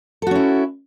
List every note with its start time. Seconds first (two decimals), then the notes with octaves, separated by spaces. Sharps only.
0.22 A4
0.27 F#4
0.31 C#4
0.35 E4